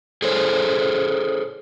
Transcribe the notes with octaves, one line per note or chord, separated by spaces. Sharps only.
G#4 A4 C5 C#5